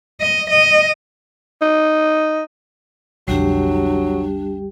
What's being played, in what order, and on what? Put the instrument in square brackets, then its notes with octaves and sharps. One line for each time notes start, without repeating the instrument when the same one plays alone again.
[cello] D#5
D#5
[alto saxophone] D#4
[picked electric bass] B1 F2 D3 [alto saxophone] F#3 [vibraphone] G3 G4 [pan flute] D4